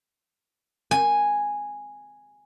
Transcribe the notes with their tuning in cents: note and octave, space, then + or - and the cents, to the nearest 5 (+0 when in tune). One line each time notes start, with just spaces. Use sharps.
G#5 -5